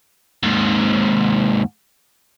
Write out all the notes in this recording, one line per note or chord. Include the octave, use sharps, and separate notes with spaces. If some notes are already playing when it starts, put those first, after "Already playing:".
D#2 G#2